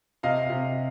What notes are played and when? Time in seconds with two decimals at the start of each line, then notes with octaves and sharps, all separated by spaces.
0.23 C3 D#5 F5
0.49 C3